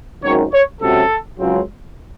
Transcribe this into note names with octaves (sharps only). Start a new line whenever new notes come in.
G#1 F#2 D#3 C#5
C#5
C#2 C3 F#3 A4
C#2 C#3 F#3 C4